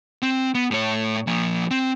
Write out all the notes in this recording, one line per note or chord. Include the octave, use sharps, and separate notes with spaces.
C4
B3
A2 C#5
F3 A#3
C4